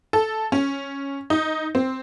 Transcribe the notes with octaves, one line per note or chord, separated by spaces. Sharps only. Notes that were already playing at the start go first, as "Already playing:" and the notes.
A4
C#4
D#4
C4